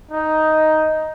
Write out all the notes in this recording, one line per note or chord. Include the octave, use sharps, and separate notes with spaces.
D#4